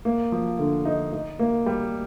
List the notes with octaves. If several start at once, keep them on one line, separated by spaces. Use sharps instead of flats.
A#3
F3
D3
D#4
D#4
A#3
G3